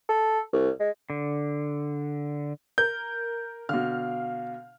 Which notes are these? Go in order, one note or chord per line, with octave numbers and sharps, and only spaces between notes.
A4
C2
G#3
D3
A#4 G6
B2 D3 F5 F6